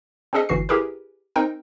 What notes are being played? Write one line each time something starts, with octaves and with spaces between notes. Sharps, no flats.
C4 D4 G#4 A4 D#5
G1 G2 E3 F#4 C7
E4 G4 G#4 A#4 B4
C4 D#4 A#4 G5